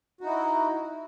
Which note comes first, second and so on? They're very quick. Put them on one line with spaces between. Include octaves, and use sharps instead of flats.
F#4 D#4 E4